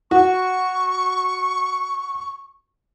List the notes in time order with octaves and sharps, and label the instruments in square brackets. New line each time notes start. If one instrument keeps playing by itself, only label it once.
[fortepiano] F#4 [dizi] C#6